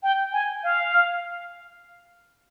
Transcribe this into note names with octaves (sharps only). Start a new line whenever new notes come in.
G5
G#5
F5